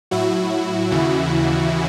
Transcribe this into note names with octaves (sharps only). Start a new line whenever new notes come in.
A2 F#3 E4 F#4
D#2 C#3 E3